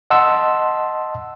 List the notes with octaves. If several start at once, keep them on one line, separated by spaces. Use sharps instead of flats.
D#5 F#5 A5 C6 E6